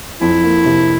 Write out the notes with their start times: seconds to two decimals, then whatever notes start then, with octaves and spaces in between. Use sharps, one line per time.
0.21 F2 E4
0.44 A#3
0.66 C3